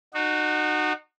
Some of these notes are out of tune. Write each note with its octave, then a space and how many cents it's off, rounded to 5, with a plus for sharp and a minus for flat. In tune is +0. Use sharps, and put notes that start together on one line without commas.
D#4 -35 F#4 +0